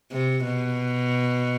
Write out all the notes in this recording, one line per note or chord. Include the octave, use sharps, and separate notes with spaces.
C3
B2